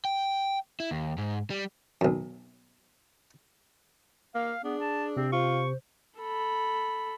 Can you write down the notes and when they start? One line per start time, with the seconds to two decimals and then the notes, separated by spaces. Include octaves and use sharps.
0.05 G5
0.80 E4
0.91 D#2
1.18 G#2
1.50 G3
2.01 B1 F#2
4.35 A#3 F5
4.64 B3 D4 G#4
4.80 A5
5.17 C3 C4
5.32 F4 C5 C#6
6.20 A4 B5